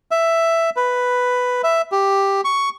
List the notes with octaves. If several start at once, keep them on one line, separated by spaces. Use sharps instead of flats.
E5
B4
E5
G4
C#6